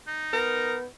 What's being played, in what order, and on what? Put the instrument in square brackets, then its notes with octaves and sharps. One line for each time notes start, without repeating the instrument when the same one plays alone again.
[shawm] D#4
[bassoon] B3 [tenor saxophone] A#4